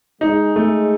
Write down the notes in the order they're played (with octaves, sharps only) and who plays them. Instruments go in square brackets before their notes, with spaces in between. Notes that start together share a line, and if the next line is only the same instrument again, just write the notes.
[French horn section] G#3 [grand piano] D#4
[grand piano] A3